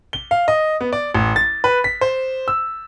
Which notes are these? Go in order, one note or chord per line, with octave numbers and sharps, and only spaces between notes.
G7
F5
D#5
B3
D5
A1
A6
B4
B6
C5
E6